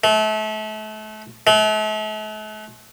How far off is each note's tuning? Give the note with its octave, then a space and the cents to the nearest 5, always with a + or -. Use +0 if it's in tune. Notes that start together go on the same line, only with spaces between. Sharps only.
A3 -30
A3 -40